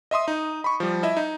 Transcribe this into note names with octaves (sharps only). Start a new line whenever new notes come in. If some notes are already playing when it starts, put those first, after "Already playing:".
D#5 E5 C6 D#6
D#4
B5 C#6
F3 G3
E4 D#5 E5
D#4